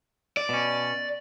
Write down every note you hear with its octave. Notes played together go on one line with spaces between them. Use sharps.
D5
B2 C#4